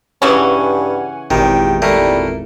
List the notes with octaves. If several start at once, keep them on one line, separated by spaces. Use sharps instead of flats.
G2 C#3 E3 C#4 F#5 G#5
G#1 E2 A#2 D#3 G4
G3 A3 A#3